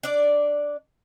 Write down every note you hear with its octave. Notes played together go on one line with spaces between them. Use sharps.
D4 D5